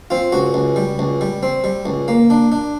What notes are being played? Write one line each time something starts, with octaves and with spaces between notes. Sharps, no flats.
C4 F4
C#2 F#4
C#2
G3
C#2
G3
C4
G3
C#2
A#3
D4
D4